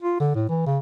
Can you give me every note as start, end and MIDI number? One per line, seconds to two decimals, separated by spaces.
0.02 0.19 65
0.20 0.31 50
0.35 0.49 45
0.49 0.64 52
0.66 0.78 49